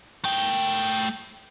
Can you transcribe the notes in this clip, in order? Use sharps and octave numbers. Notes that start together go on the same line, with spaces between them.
A3 G5